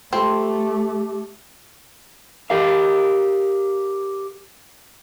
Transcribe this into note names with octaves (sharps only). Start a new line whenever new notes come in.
A3 C4 F4 G4 A4 B5
G4 A#4 F5